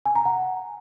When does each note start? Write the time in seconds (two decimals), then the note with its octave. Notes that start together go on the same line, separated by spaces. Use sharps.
0.06 G#5
0.15 A#5
0.25 F#5